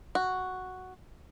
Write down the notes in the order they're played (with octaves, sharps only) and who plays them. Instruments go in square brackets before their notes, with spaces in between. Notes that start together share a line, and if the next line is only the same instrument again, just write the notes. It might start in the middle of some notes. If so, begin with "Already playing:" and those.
[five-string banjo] F#4